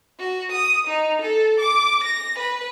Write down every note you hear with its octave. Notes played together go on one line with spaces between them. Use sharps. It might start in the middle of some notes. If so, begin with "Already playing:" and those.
F#4
D#6
D#4
A4
D6
A#6
B4